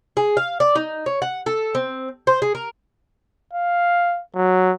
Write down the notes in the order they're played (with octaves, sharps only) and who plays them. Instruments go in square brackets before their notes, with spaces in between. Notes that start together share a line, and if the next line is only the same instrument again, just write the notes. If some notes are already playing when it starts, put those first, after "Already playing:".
[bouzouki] G#4
F5
D5
D#4
C#5
F#5
A4
C4
C5
G#4
A#4
[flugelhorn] F5
F#3